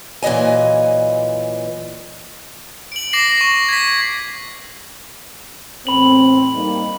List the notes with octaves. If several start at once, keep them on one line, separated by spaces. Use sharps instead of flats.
A#2 E3 F#3 D#5 G#5
D7 F#7
D6 A#6 C7 F#7
C#6 A#6
G#6 B6
E2 A2 C4 B5 F#7
G3 A#3 D#4